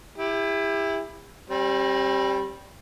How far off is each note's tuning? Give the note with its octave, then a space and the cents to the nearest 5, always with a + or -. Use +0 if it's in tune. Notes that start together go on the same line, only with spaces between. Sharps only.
E4 +0 G4 +35
G3 +0 C4 +40